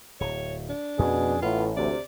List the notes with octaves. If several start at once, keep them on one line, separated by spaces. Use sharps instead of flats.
D1 C#5
D4
F2 B2 C#4 G#4
A1 A2 B3 F4
D2 C3 D5